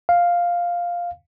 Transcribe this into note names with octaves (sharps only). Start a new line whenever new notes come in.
F5